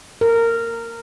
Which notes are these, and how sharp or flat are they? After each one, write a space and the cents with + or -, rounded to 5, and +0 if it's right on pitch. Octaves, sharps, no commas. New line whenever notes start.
A#4 -15